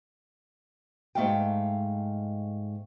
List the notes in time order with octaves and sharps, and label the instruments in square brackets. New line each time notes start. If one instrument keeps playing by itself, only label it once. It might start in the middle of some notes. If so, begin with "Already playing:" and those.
[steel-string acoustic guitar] G#2 A3 F5 G5